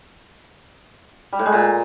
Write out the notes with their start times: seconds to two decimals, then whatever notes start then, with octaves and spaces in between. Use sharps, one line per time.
1.33 G3
1.39 A2
1.46 G#3
1.52 A#2